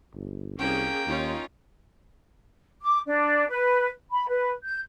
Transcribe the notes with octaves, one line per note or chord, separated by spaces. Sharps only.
G1
C2 A#3 C#4 G#4 G5
D#2 C#4 D#4 F4
D6
D4
B4
B5
B4
G6